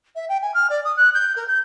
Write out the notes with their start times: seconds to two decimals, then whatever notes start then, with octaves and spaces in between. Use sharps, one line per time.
0.15 E5
0.28 G5
0.42 G#5
0.54 F6
0.69 D5
0.84 D#6
0.97 F#6
1.14 G6
1.36 A#4
1.47 G6